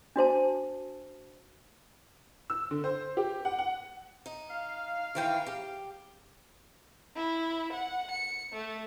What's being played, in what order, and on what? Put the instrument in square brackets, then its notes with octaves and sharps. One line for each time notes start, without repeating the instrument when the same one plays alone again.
[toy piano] D4 F#4 C5 A5
[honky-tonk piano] E6
D3
C5
G4
F#5
F#5
[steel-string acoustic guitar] D#4
[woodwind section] F5
[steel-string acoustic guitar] D#3 E3 G5
G4
[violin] E4
F#5
C#7
A3